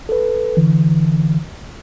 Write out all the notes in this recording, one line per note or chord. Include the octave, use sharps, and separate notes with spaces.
A4 B4
D3 E3